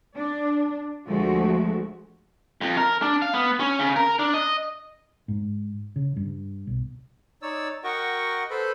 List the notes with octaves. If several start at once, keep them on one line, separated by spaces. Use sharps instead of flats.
D4
D2 F3 G#3 A3 F#4
F2
A#4
D4
F5
B3
C#4
C#3
A#4
D4
D#5
G#2
C#3
G2
B1
D#4 C#5 D5 E6
F#4 A#4 D#5 F#5 G5 C#6
A4 B4 C5 B5